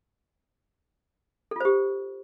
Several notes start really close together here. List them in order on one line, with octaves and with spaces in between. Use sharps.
A4 F4 C5 G4